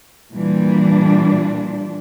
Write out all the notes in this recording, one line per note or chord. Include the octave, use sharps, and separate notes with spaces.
A#2 E3 G3 D4